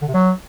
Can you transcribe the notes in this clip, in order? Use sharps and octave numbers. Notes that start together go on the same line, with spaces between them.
D3
C3
F#3